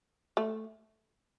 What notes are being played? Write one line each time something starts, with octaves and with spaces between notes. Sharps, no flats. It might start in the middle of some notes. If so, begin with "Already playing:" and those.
A3